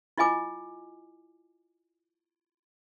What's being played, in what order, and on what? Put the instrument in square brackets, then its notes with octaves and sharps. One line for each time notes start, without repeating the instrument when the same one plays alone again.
[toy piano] E4 F4 D#5 G#5 D6